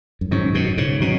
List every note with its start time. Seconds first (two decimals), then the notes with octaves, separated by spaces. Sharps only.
0.21 F#2
0.31 G#2 D#3 F#3 C#4
0.54 F#2 B2
0.77 G#2 C#3
1.01 B2 D#3 F#3 C#4